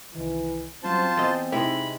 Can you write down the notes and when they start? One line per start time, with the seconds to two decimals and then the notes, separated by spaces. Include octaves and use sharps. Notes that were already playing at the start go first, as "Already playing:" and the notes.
0.14 C2 D#3 E3
0.84 F#3 G3 C4 C#4 F4 C5 A5
1.17 E2 D#5 C6 G6 A6
1.52 C3 G#3 D#4 E4 B5